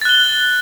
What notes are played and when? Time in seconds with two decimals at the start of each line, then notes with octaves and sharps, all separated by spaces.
0.01 A6
0.05 F#6
0.09 G7